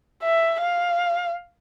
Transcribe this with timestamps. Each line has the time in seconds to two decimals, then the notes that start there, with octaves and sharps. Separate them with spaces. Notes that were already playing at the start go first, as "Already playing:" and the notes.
0.23 E5
0.61 F5